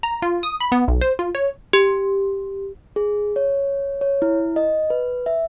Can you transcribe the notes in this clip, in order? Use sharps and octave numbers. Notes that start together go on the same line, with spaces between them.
A#5
F4
D#6
B5
B3
B1
C5
F4
C#5
G4
G#4
C#5
C#5
E4
D#5
B4
E5